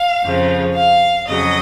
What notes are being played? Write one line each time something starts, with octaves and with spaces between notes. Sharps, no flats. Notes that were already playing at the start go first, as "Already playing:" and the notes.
Already playing: F5
F2 C#3 F3
F5
F2 C#3 F#3 D#5